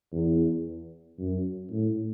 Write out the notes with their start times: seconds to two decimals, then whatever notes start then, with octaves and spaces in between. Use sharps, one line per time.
0.12 E2
1.18 F#2
1.70 A2